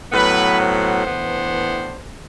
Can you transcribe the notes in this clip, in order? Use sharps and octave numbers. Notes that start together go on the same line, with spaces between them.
A2 F#3 B3 B4
C5
A2 E3 B3 D4